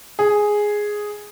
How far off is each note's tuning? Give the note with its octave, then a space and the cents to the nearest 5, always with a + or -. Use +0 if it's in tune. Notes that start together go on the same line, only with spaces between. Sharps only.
G#4 +0